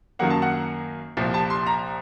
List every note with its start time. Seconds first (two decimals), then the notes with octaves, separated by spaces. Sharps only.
0.19 F#2 D#3 F#3 A#3 F#5
0.30 A5
0.42 F#5
1.17 C2 A#2 F3
1.34 A5
1.50 C6
1.66 A#5